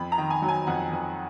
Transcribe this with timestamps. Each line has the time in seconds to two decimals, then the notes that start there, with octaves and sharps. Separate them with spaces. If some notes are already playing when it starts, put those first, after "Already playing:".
Already playing: F2 B5
0.12 A#5
0.18 D#3
0.30 G#5
0.42 F#3
0.48 G#5
0.67 F2 F#5
0.92 F2